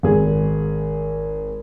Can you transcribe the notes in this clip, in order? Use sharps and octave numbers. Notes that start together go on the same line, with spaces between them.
G#1 G#4